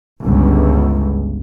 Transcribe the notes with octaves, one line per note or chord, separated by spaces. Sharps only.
G1 C#2